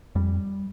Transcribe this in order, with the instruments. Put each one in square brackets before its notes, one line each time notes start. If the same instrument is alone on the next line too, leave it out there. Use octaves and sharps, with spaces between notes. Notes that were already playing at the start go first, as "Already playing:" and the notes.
[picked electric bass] F2 G3